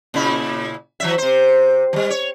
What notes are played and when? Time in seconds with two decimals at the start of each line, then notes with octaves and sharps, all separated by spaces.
0.14 A#2 C#3 E4
1.00 E3 F#3 E5
1.18 C3 C5
1.93 E3 G3
2.10 C#5